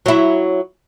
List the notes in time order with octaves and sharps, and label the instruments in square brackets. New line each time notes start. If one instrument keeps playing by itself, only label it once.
[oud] F#3 E4